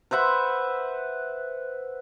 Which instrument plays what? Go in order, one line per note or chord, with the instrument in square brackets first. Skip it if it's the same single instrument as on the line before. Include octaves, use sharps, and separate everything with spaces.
[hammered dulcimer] B4 C5 E5 F#5